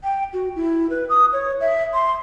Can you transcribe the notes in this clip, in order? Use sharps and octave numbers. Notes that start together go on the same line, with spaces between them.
G5
F#4
E4
B4
D#6
C#5
E5
C6